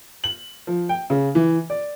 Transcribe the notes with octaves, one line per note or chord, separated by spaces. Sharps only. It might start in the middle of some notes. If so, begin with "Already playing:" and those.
F#7
F3
G5
C#3
E3
D5